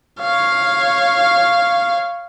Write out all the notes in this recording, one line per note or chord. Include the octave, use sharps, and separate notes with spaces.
C#5 F5